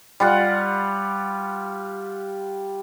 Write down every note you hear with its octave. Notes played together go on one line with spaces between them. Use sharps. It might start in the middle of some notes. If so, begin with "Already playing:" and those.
G3 F4 F#5